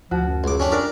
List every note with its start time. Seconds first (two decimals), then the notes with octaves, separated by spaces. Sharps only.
0.11 D2 F3 F#4
0.25 F#2
0.44 C#2 D6
0.60 C#4 D4 G4
0.72 D4 A#4 D5 E5